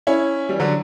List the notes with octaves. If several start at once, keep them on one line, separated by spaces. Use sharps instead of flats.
C#4 E4
E3 G3
D3 F#3